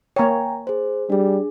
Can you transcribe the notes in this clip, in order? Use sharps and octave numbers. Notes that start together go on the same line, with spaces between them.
A#3 C#5 G5 G#5 A#5
G#4 C5
G3 D4 G#4